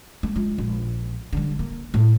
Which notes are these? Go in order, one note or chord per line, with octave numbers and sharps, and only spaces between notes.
A3
G#3 F4
A#1
D3 G3
A#3
A2